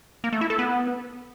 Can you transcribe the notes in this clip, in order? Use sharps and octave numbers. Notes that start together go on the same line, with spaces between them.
A#3
A3
E4
A4
B3